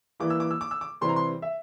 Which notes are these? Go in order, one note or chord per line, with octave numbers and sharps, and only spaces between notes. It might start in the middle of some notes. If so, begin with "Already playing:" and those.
E3 G3 A#3 E4 D6
E6
D6
E6
D6
E6
D6
C3 E3 G3 C4 E4 C6
A#5
C6
E5